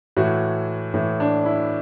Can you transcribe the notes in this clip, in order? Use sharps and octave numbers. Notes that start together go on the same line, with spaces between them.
A2 E3 F#4
A2 E3
D4
E4